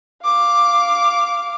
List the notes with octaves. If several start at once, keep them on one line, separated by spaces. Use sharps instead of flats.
F5 D6